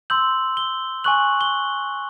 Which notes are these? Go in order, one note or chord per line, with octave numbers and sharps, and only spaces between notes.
C6 E6 G6 F#7
G7
G#5 C#6 F#6 F#7
G7